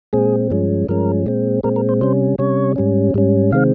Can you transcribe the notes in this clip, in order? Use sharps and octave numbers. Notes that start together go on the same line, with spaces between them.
A#2 G#3 C4 G#4
G2 F3 G#3 C#4
G2 F3 G#3 C#4 A#4
A#2 G#3 C4
A#2 G#3 C4 A#4
A#4
C5
C3 G3 C#4 C5
C3 G3 C#4 C#5
G#2 G3 C#4
G#2 G3 C#4
C3 D#3 G#3 C4 F5